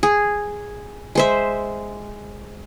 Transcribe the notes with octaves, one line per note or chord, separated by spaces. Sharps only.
G#4
G#3 C5 E5